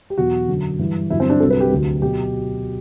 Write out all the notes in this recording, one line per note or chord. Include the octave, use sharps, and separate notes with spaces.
G4
E2 B2 F#3 F#4
F#2 D3 F#3
G2 E3
G2 D3 F#3 E4
C4
D4
C2 C3 F#3 A4
B4
G4
D2 D3 F#3
B2 F#3 G4